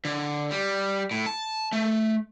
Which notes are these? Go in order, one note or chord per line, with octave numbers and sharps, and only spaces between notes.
D3
G3
A2
A5
A3